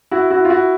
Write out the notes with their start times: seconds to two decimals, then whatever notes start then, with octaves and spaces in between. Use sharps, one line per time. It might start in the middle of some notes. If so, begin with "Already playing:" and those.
0.11 E4 F#4
0.30 E4 F#4
0.45 F4
0.50 E4 F#4